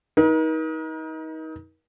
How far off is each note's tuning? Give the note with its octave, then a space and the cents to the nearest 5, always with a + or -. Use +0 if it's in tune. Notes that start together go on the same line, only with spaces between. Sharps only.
D#4 +30 A#4 +45